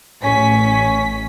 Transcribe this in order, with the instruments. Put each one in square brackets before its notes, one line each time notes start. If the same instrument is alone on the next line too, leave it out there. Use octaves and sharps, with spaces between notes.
[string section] A1 B6 [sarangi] C#4